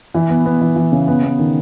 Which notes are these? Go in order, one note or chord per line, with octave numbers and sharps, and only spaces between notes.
E3 E4
B3
B3
E3
E3
C#3
B3
B3
D#3